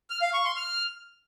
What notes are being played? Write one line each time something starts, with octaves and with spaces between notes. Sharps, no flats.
F6
F5
C#6
C6
F6